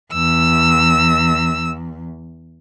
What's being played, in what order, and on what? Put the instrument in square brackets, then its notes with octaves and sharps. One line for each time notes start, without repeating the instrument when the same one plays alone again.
[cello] E2 [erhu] E6